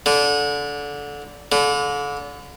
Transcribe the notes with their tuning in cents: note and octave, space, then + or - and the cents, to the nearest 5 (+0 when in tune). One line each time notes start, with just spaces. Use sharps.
D3 -20
D3 -35